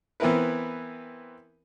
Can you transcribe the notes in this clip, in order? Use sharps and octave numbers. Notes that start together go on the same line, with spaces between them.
E3 B3 C4 E4 A#4 B4